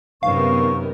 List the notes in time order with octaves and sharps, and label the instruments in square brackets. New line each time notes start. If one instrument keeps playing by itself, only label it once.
[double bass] F#2 C3 [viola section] D#3 B3 A#4 [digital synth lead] F5 [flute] C#6